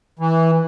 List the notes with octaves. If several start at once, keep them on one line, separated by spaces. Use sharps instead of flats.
E3